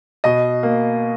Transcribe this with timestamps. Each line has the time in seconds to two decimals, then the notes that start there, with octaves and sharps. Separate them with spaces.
0.24 B2 D#5
0.63 A#3